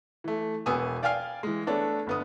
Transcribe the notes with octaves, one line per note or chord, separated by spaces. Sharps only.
E3 A3
E1 B3 G#5 D#6 E6
D5 F5 G5 G#5 F6 C7
E3 G#3
A3 B3 D4 A4 C#5
G1 B3 D#6